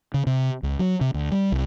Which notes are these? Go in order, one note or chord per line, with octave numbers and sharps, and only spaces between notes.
C#3
C3
C#2
F#3
C3
D2
G3
C2